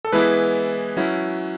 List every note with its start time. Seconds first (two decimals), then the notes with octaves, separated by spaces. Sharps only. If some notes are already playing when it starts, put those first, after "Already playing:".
0.05 A4
0.12 E3 G#3 B3 E4 B4
0.97 F#3 C#4 E4